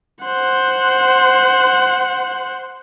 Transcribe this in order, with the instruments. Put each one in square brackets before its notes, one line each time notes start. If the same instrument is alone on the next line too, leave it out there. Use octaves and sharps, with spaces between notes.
[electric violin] C5 F#5